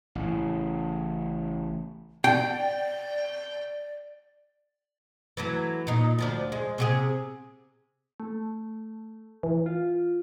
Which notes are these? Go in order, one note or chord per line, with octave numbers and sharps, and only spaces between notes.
A1 A2 C#3
D5 G5
E3 F#3 A3
A#2 D#4
D2 F3 D4
G#3
C3 F#4 G#4
A3
E3
F4